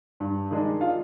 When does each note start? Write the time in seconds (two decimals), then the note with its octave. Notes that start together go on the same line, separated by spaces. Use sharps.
0.20 G2
0.51 D#3 G#3 D4
0.81 F4 F5